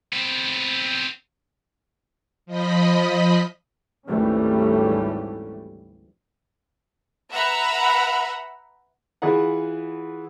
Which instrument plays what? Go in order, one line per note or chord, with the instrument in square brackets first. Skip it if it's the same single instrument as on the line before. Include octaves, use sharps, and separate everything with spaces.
[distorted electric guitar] B3 C4
[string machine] F3 D#5 B5
[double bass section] G#1 D2 E3 G3 A3 C#4
[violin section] B4 E5 F#5 A#5 B5
[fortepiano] E3 F4 G#4 B4 F#5